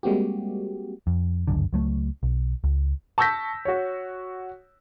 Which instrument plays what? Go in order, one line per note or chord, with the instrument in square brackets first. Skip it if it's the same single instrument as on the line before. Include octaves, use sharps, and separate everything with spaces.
[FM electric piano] G3 G#3 A#3 C4 F#4 G4
[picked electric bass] F2
G1 C#2 F#2 D3
C#2 F#3 A3
B1
C#2
[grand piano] A5 C#6 E6 G6 A#6 B6
F#4 C#5